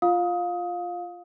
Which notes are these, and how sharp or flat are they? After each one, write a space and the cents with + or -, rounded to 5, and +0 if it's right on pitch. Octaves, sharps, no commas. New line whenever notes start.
F4 +0 F5 +20 D#6 +20